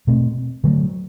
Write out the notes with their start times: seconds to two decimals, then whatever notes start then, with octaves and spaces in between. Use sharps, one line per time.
0.07 B2 A3 C4
0.64 D3 F#3 A3